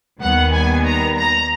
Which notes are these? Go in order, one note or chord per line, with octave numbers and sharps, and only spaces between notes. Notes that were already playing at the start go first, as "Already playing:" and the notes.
D#2 D#3 G3 B3 F#5
G#5
A#5
A#5